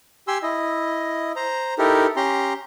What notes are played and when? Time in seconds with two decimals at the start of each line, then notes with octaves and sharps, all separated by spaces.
0.28 G4 G#5 C6 E6
0.43 E4 D#5
1.36 C5 A#5
1.78 D#4 E4 G4 A4 A#4
2.16 C#4 G4 A#5 C6